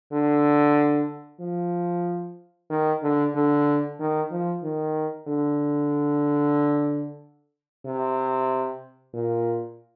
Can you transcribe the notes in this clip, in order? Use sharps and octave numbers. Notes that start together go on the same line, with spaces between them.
D3
F3
D#3
D3
D3
D#3
F3
D#3
D3
C3
A#2